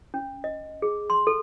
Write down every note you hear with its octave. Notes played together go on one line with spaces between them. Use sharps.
C#4
D#5
G#4
C6
A4